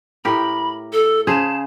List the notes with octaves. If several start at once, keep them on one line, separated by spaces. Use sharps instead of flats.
A2 G4 A#4 B5
A4
C#3 G#4 C5 A5